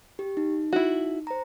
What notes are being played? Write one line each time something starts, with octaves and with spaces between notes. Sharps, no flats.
G4
D#4
E4 F#4
C5 A#5